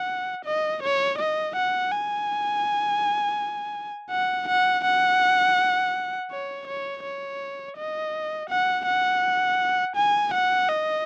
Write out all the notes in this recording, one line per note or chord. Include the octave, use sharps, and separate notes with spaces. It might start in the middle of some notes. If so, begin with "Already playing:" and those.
Already playing: F#5
D#5
C#5
D#5
F#5
G#5
F#5
F#5
F#5
C#5
C#5
C#5
D#5
F#5
F#5
G#5
F#5
D#5